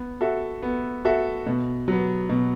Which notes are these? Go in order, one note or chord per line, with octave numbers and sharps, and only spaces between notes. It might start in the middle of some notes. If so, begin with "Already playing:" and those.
Already playing: B3
F#4 A4 E5
B3
F#4 A4 E5
B2
F#3 B3
B2